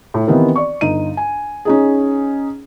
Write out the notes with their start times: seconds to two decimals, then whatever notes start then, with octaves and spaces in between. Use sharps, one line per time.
0.14 A2
0.27 D#3 E3 B3 C4 G4 A#4
0.56 D5 C#6
0.81 G1 D#4 D#7
1.17 G#5
1.65 C#4 D#4 G#4